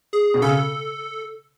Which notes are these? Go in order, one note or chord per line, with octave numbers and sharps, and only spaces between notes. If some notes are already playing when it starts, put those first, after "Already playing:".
G#4
B2
C#3 A4